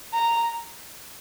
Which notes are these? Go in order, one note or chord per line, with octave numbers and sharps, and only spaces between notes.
A#5